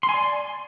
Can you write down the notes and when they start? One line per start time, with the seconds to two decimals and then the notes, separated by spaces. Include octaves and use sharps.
0.03 C6
0.09 G#5
0.14 D5